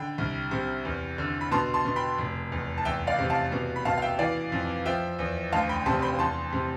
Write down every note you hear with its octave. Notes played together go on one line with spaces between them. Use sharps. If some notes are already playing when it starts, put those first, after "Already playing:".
Already playing: D3 G5 B5
C2
C3
E2
D3
B5
B2 A5 C6
A5 C6
B2
G5 B5
F1
E2
A5
E2 E5 G5
D5 F5
C3
F5 A5
B2
B5
B2 F5 A5
F5
E5 G5
E3 D5 F5
F2
F3 E5 G5
E2
D2 F5 A5
G5 B5
C3 A5 C6
G5 B5
E2 A5 C6
C3